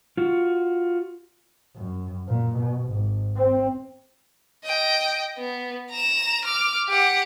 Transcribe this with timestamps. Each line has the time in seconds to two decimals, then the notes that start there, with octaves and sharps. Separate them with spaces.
0.17 F4 F#4
1.75 F#2
2.28 A#2
2.57 B2
2.89 G#1
3.37 C4
4.64 D#5 G5
5.38 B3
5.91 A#5 E7
6.45 D6 F6
6.88 G4 F#5